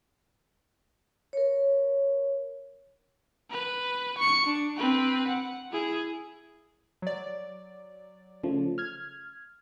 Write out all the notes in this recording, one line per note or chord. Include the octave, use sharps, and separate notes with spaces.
A#4 C#5
B4
C#6 C#7
D4
C4 B4
F#5
E4 G#4
F#3 D5
C#3 F3 A3
F6 G#6